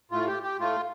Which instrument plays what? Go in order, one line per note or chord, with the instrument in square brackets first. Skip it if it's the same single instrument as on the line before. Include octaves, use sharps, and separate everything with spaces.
[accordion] A2 A3 F4
G4
G4
A2 A3 F4